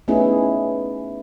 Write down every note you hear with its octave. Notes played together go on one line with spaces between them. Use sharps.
A3 B3 C#4 D#4 E4 G#4